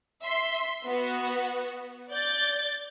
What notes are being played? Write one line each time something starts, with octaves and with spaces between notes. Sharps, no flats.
E5 C6
B3 F#4
D5 G6 A6